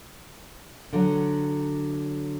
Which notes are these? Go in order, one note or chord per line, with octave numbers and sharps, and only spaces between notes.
D3 F#3